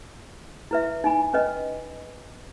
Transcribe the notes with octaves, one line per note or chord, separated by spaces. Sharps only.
E4 B4 E5
D#4 G#5 B5
C#4 B4 D#5